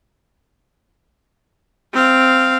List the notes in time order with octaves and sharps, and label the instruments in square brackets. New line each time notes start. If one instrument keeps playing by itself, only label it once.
[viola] C4 F5